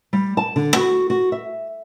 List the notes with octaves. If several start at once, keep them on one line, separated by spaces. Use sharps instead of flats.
G3
A5
D3
F#4
F#4
E5